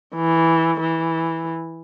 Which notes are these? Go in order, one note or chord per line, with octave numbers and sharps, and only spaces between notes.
E3
E3